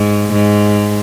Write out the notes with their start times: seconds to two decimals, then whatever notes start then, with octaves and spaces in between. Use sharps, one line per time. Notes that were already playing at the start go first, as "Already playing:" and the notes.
Already playing: G#2
0.33 G#2